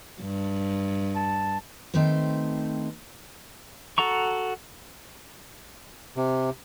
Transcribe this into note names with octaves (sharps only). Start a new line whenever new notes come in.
G2
A5
D#3 A3 C4 B4 C5
F#4 A4 F#5 A#5 C#6
C3